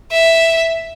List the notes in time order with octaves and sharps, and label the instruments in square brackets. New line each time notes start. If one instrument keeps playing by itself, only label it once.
[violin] E5